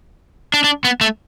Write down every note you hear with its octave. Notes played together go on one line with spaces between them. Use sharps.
D4
D4
B3
A3